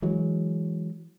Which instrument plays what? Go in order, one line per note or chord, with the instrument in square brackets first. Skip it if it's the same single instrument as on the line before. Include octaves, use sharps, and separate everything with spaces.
[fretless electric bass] E3 F#3 G#3